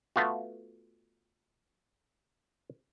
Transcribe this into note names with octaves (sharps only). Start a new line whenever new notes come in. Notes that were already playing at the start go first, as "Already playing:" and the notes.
A3 B3 F4 F#4